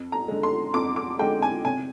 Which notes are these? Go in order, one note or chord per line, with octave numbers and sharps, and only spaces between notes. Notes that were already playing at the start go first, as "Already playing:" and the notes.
Already playing: F2
A#5
D3 G#3
C6
F2 D6
D6
D3 G#3 G5
G#5
C3 G#5